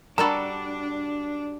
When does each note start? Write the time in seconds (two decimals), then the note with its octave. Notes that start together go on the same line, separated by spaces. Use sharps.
0.18 G3 D4 F#4 A4 A#4 A5 B5